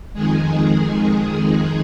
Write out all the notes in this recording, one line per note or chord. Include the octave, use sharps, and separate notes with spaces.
F2 D#3 G#3 G#4